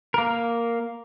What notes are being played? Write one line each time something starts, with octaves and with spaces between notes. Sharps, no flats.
A#3 A#4